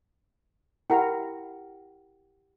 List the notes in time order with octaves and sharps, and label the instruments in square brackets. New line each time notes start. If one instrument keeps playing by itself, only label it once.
[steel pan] E4 A#4 A#5 [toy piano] G4 F#5 G5